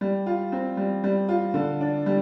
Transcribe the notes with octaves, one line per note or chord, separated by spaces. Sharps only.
G3
F4
C4
G3
G3
F4
D3
D4
G3